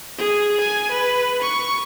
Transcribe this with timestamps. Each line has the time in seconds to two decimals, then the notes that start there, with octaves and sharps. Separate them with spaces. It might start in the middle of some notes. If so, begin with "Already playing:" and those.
0.18 G#4
0.61 G#5
0.91 B4
1.42 C#6